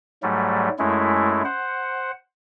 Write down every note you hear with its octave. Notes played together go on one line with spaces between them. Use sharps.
G#2 F#3 G3 A3
F#2 G#3 A3 E4
C5 F#5